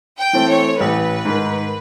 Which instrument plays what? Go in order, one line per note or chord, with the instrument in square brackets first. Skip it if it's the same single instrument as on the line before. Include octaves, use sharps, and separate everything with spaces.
[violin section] G5
[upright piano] E3 A3 C4
[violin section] C#5
[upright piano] A1 [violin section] B4
[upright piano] G#2 D#3